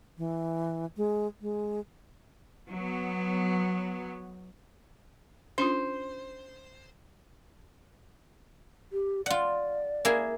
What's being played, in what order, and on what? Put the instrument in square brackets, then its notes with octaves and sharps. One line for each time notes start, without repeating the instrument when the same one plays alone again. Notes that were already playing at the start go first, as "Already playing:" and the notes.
[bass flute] E3
G#3
G#3
[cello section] F#3 B3
[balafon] C#4 D4 F4 [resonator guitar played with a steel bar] C5
[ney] G4
[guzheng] F4 F#5 [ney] D5
[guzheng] A#3 E4 G#4